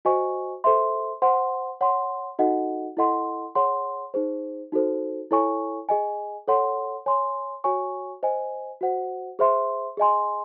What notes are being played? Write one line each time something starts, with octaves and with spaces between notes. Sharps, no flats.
F#4 C5 D#5 G#5 C#6
A4 C5 E5 C6
C5 F#5 C6
C#5 F#5 C6
D#4 F#4 A4 D#5 F#5
E4 A4 D#5 F#5 C6
G#4 C#5 F#5 C6
D#4 G#4 C5
D#4 F#4 A4 C5
E4 A4 C#5 G#5 C#6
G#4 D#5 G#5
A4 C#5 F#5 C6
C#5 G#5 C6
F#4 C#5 G#5 C#6
C5 D#5 G#5
F#4 C5 F#5
G#4 C5 E5 C6
G#4 D#5 G#5 C6